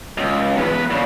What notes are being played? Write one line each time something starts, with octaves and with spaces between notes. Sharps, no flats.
C#2
E2 B4
A#2 C#3